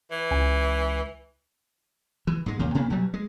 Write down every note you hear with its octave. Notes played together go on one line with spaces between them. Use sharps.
E3
C#2 G#5
E3
G#2 G#3
D#2 A#2 C#3
C3 A#3 B3 D4
B1 F#3 G3
G#3